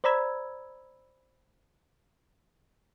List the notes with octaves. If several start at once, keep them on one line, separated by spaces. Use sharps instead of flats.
C5 D5 A#5 B5 E6 G#6